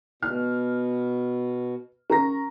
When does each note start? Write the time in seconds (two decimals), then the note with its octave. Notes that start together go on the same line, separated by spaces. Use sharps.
0.22 B2 F6
2.10 C#4 A#4 A#5 A#6